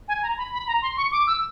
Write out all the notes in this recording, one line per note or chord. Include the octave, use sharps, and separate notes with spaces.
G#5
A#5
B5
B5
A#5
C6
C#6
D6
E6